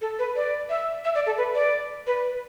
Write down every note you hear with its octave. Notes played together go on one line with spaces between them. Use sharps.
A4
B4
D5
E5
E5
D5
A4
B4
D5
B4